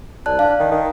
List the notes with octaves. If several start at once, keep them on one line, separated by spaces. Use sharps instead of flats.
C2 D5 A5 F#6
D4 F5
D#3
D#3